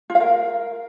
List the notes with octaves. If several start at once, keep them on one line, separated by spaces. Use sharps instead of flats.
F4
F5
A#4